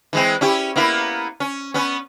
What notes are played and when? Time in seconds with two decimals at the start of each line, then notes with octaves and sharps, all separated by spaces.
0.13 E3 G#3 C4
0.41 C#4 E4 G4
0.76 A#3 B3 E4
1.40 C#4
1.74 B3 C#4